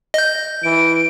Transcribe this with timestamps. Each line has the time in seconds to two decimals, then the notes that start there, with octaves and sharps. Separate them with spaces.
0.14 D#5 G6
0.63 E3 D7